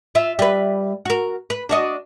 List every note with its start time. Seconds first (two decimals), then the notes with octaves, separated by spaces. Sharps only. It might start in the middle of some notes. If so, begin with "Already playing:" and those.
0.15 F4 E5
0.39 G3 B4
1.05 F#4 A#4
1.50 B4
1.69 D4 F#4 D#5